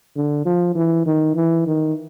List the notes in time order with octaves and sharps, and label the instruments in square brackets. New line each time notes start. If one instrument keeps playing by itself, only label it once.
[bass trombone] D3
F3
E3
D#3
E3
D#3